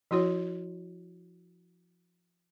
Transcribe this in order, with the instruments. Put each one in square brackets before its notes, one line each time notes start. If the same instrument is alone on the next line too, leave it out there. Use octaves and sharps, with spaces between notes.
[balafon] F3 E4 F#4 C#5